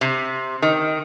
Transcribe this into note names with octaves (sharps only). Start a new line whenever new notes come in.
C3
D#3